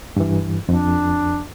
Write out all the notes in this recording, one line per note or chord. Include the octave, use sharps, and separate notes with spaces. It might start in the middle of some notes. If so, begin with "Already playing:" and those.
G2 E3
F2 D4